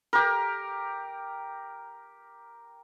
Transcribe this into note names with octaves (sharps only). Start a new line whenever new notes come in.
G4 A#4